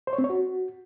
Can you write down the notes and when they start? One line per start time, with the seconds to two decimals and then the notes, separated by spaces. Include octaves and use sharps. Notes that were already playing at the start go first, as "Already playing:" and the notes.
0.07 C5
0.13 C#5
0.18 C4
0.24 C#5
0.30 F#4